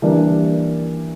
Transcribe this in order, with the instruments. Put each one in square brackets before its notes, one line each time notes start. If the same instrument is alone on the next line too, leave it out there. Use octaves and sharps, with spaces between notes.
[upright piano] E3 G3 A#3 D4 A#4